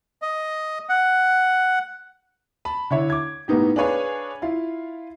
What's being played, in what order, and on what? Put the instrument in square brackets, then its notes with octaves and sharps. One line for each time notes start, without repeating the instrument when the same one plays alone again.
[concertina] D#5
F#5
[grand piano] A5 B5
D3 E4 C#5 E5
D6 G#6
A2 A#3 B3 D#4 G4
D4 G#4 B4 C#5 F5 G#5
E4 F4 F5